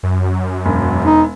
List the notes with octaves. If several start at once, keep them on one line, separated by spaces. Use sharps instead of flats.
F#2
E1
D#4